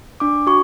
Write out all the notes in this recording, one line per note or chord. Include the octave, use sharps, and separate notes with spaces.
D4 D6
F#4 C#6